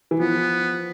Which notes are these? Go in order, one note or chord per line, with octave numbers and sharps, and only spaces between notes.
E3
F3 B3